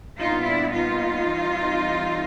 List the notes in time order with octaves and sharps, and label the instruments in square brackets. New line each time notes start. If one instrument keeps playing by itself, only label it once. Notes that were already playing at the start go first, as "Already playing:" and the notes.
[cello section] A#2 G3 B3 D4 D#4 F4
D4 E4
D#4 F4
E3 G3 C4